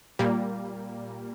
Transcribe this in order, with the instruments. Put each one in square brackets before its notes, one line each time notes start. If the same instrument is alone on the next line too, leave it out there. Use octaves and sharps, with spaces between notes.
[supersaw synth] A#2 G3 A#3